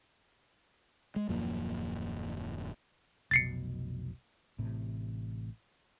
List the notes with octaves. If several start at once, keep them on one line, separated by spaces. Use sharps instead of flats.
G#3
D#1 F#2 F3 A#3
F1 B1 B2 A6 C7 C#7
A1 A2 C3